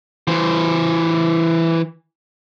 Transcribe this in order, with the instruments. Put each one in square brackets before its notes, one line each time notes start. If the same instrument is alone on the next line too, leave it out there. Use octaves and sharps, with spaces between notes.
[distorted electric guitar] E3 C5